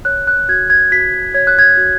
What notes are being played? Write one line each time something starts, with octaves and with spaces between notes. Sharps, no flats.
C#5 F#6
F#6
F#4 G#6
G#6
F#4 B6
C#5 G#6
F#6
G#6
F#4